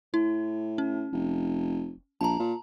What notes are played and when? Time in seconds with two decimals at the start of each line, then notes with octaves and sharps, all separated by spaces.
0.14 A2 E4
0.78 C#4
1.13 F1
2.21 A#1 A5 A#5
2.39 A#2